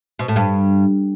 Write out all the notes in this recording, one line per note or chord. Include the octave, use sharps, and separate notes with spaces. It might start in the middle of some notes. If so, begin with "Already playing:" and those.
B2
A2
G2